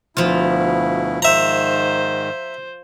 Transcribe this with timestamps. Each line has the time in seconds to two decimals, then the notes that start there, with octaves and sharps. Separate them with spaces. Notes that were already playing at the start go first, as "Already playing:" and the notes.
0.17 D2 B2 F3 E4 F4
1.22 G#2 D#3 C5 E5 A#5